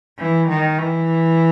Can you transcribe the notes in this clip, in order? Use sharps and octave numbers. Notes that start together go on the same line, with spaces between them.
E3
D#3
E3